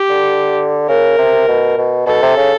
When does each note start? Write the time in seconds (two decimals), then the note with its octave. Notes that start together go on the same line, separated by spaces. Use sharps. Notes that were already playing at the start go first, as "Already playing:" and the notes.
Already playing: G4
0.10 D3
0.89 C#3 A#4
1.18 C3
1.48 B2
1.78 B2
2.06 B2 A4
2.22 C3
2.37 C#3